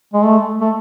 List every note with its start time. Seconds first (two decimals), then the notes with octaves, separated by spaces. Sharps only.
0.14 G#3
0.24 A3
0.61 A3